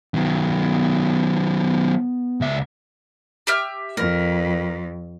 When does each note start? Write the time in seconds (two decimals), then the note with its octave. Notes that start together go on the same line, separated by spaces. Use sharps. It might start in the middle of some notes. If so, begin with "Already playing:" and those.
0.14 D#3 F#3 B3
2.41 C#2 E5
3.47 G4 E5 F6
3.97 F2 A#4